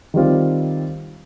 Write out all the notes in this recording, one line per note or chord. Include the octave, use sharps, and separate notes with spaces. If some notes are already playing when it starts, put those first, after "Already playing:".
D#3 G3 C4 F4